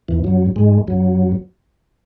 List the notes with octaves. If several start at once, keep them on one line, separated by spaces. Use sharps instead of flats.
E2 E3
F#2 F#3
G#2 G#3
F#2 F#3